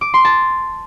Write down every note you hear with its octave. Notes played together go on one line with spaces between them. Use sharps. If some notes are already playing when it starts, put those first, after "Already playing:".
D6
C6
A5